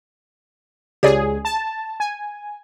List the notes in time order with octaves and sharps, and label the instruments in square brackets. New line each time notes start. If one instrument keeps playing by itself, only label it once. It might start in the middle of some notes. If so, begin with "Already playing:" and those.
[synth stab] C#2 G#4 [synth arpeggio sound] G4 C#5 D5
[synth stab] A5
G#5